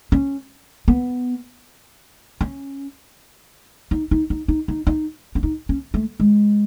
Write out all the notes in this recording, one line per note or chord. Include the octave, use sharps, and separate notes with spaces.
C#4
B3
C#4
D#4
D#4
D#4
D#4
D#4
D#4
C#4
D#4
C#4
A3
G#3